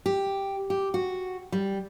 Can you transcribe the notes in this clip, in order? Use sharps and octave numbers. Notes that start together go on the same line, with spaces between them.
G4
G4
F#4
G3